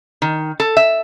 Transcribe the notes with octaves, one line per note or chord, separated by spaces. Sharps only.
D#3
A4
E5